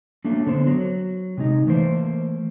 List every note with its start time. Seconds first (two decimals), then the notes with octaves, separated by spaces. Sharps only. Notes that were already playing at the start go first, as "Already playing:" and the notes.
0.25 F#3 A3 A#3 D4
0.47 D3 B3 C5
0.67 F#3
1.38 C3 G#3 D#4
1.67 E3 A3 A#3 C5